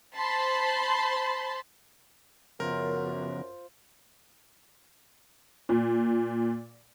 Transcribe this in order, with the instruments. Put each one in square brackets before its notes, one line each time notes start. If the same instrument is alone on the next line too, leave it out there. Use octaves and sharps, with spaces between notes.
[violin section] C5 A5 B5 C6
[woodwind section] F#2 [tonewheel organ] C#3 F3 B3 [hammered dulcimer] F4 C5 [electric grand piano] A#4
[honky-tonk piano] A#2